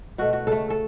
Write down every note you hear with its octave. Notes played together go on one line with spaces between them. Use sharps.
B2 A3 F#4
F#4
C#3 A3 A4
A4